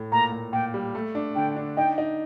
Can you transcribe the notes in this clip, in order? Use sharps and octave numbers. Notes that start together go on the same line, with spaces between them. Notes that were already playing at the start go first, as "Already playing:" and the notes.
Already playing: A2
A#2 A#5
A#2
A#2 G5
G3
A3
D4
D3 G5
D4
D#4 G5
D#4